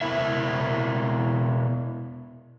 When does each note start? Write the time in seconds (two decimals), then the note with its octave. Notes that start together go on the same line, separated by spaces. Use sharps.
0.01 B2 E4 A#4 E5